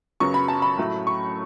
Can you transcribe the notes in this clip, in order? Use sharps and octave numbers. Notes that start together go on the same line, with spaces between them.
F#2 C#3 F#3 B3 C#6
B5
A5
B5
A2 F#3 A3
C#6